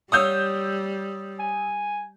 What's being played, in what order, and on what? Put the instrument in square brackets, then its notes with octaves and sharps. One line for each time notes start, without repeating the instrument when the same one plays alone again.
[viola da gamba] G3 [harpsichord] C#5 F5 F#5 [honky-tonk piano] D#6 E6 G6
[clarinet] G#5